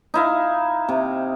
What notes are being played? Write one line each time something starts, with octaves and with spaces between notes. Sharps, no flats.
D#4 E4 F5
C3